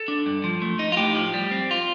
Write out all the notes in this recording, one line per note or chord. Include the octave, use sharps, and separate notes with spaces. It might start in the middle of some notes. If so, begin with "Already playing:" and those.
Already playing: A4
D4
G2
F3
A3
D#4
F4
A2 G4
F3
G3
C4
F4